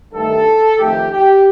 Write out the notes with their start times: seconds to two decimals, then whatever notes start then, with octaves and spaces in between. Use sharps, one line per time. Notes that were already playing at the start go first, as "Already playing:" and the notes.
0.13 G2 D#3 A3 A4
0.78 F2 D#3 A3 G4
1.11 G4